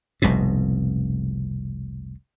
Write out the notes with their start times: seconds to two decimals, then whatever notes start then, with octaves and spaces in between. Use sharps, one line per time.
0.22 F1 C2 G#2 B2